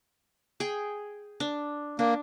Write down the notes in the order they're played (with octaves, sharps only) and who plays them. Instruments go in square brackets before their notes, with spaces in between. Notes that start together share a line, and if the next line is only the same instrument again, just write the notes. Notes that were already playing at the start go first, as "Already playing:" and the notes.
[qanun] G#4 G5
D4
[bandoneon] A#3 [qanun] D4